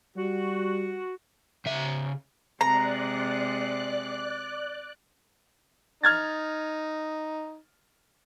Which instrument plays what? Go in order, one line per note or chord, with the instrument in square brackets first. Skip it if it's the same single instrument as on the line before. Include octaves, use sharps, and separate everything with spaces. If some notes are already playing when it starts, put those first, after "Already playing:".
[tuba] G3 [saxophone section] F#4
[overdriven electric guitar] C#3 E5
[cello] C3 G#3 [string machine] D5 F#6 [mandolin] A#5
[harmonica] D#4 [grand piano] F6 G#6 A6